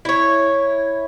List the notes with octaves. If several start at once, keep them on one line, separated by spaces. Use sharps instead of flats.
E4 C#5